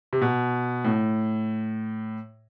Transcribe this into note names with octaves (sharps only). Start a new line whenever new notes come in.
C3
B2
A2